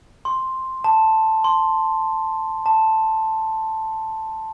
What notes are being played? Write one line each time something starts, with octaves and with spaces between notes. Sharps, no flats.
C6
A5
C6
A5